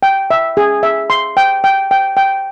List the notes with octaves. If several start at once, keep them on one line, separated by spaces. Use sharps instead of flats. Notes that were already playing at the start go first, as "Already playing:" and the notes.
G5
E5
G#4
E5
C6
G5
G5
G5
G5